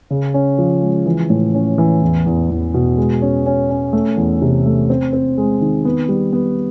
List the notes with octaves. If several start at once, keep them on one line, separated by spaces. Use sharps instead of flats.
C#3
C#4
F3
G#3
E3
A2
C#4
E3
E2
E2
E2
B2
G#3
C#4
C#4
C#4
A3
E2
C3
A3
C4
C4
G#3
D#3
B3
G3
B3